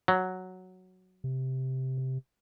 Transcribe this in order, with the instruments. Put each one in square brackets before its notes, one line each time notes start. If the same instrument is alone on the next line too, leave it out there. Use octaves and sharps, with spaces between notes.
[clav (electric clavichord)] F#3
[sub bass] C3